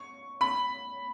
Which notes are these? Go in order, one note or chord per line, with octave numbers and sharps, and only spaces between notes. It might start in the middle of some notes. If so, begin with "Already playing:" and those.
Already playing: C#6
B5